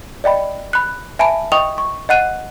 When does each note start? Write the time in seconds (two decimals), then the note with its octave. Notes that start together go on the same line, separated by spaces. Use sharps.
0.24 D5 D#5 G5 B5
0.73 B5 F#6
1.19 E5 G#5 A5 B5 D7
1.52 D#5 G5 C#6 D#6 F7
1.78 C#6
2.09 D#5 F#5 F#6 D#7